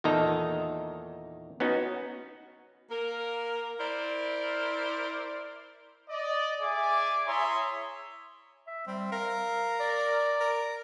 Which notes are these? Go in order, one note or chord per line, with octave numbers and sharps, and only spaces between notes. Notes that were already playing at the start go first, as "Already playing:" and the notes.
E2 A#2 D#3 D#4 A4 A#5
B3 C#4 D#4 F#4
A#3 A#4
E4 A#4 C5 D5
D5 D#5
G#4 D5 E5 G#5 D6
E4 G#4 C#5 E5 A#5 C6
E5
G3 C4
A#4 F5
D5
A#4